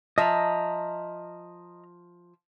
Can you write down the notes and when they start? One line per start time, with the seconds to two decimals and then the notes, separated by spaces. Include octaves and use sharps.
0.18 F3 D#5 E5 A#5